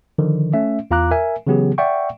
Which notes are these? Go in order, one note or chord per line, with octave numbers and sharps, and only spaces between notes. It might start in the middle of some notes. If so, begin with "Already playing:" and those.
D3 D#3 F3
A3 C#4 E5
E2 F4 F5 A#5 D6 F#6
A#4 E5 G#5
C#3 E3 F#3 B3 G4 G#4
D5 E5 F#5 G5 C#6